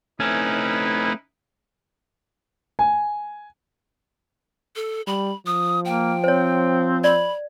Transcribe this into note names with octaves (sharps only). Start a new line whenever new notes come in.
A3 C4 C#4 D#4 E4 B4
G#5
A4
G3 B5
F3 D#6
A#3 G5
C4 C5 C#5
D5 B5